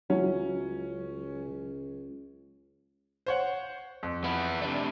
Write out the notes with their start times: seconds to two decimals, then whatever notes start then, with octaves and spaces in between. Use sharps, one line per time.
0.10 C#2 F#3 C#4 E4
3.26 C5 C#5 F#5
4.03 F2
4.24 B3 E4
4.61 C3 A3 D4